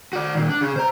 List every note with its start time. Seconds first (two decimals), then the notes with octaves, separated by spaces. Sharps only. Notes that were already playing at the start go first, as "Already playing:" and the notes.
0.13 F#4 D5
0.35 A#2 D#3
0.49 D4
0.61 C#3 G#4
0.76 C5 A#5